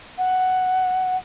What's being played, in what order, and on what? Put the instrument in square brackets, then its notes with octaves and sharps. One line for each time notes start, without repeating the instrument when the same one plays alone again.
[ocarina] F#5